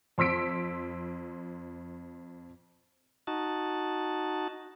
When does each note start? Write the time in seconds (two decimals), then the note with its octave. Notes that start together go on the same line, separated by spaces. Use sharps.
0.18 F2 C6 E6 B6 D7
3.27 D#4 F#4 A5